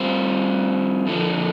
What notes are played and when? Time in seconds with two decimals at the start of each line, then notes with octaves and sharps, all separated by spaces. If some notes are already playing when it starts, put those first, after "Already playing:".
Already playing: G3 C4 F4 C5
1.07 F2 D3 F3